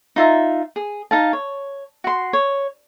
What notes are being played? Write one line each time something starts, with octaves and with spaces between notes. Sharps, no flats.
D#4 F4 E5 A#5
G#4
D#4 F5 A5
C#5
F#4 C6
C#5